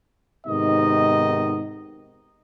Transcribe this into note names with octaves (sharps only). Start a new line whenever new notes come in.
G#2 C3 D#3 B3 D#4 D#5